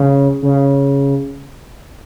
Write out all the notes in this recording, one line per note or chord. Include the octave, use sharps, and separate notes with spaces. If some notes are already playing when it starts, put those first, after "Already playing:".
Already playing: C#3
C#3